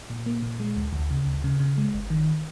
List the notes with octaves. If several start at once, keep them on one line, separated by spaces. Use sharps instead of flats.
A#2
A#3
A#2
G#3
D2
D2
C#3
D2
C#3
C#3
G#3
G1
D#3